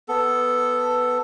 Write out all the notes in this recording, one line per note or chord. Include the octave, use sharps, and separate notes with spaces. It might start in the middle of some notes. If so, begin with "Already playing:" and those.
B3 A4